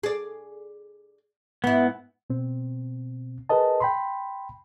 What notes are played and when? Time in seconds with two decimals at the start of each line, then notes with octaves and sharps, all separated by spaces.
0.03 G#4 D5
1.64 G#2 B3 E4
2.30 B2 C4
3.49 G#4 A#4 B4 D#5 A5
3.80 G5 B5 C6